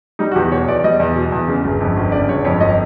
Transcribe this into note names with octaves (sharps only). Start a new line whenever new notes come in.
G3 D#4
F#4
E2 G4
B2 C#5
E2 D5
G3 D#5
E2
B2
E2
C#3
G1
F2
G1
C#3 D5
G1 C#5
F2 C#5
G1 D#5